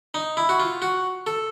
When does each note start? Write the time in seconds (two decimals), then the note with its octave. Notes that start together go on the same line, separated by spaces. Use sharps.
0.14 D#4
0.37 E4
0.49 F#4
0.60 F4
0.82 F#4
1.27 A4